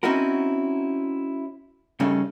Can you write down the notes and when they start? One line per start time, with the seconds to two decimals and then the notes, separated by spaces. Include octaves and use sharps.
0.03 C4 C#4 D#4 E4 F#4 A#4
2.00 G2 C#3 A3 C#4 D#4